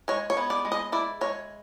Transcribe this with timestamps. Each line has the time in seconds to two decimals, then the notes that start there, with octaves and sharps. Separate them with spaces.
0.08 G#3 C#5
0.30 C#5
0.37 B3
0.50 D5
0.65 G#3
0.72 D#5
0.92 E4 D5
1.21 G#3 C#5